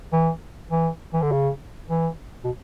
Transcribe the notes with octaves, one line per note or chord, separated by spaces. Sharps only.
E3
E3
E3
D3
C#3
E3
B2